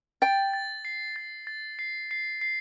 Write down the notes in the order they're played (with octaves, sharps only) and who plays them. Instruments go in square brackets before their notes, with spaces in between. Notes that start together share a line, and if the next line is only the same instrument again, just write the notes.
[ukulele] G5 [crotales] A6
[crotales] A6
C7
A6
A6
C7
C7
C7